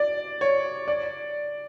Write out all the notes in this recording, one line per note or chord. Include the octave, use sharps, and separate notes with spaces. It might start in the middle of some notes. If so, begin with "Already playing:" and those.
Already playing: D5
C#5
D5